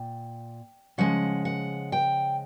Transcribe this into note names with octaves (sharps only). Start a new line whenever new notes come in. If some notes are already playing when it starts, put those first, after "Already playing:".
Already playing: A#2 G5
C#3 F3 G#3 F#5
F#5
G5